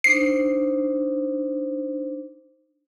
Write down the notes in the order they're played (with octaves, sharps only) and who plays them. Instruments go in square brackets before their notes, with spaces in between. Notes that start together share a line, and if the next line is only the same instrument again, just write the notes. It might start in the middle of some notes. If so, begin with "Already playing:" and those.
[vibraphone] D4 D#4 C5 [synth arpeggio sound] C7